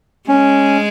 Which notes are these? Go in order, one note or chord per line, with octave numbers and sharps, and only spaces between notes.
G#3 C#4